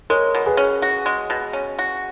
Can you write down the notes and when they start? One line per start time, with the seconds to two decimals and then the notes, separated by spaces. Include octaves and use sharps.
0.10 G#3 A#4 C#5
0.35 B2
0.46 G#4 B4
0.57 C#4
0.82 F#4
1.06 G#3
1.30 B2
1.53 C#4
1.79 F#4